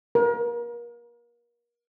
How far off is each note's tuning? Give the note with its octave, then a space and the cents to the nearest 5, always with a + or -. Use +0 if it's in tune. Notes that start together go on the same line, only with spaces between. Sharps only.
A#4 +35